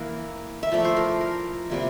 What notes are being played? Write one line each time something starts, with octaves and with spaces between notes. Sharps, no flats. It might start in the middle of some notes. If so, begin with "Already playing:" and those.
Already playing: E3 A#3 E4 A#4
E5
F3 A3 E4 D5
C5
A#4
A#4
C3 G3 A#3 E4